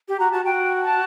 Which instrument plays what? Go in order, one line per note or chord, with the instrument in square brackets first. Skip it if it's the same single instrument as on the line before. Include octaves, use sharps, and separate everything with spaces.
[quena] G4
[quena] F#4 [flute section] A#5
[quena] F#4 [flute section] A5
[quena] F#4 [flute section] G5
[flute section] A5